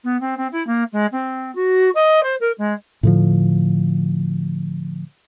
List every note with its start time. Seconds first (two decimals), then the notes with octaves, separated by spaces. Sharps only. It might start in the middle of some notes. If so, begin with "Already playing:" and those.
0.04 B3
0.20 C4
0.37 C4
0.52 E4
0.66 A#3
0.92 G#3
1.12 C4
1.55 F#4
1.95 D#5
2.22 C5
2.40 A#4
2.58 G#3
3.03 A2 D3 F3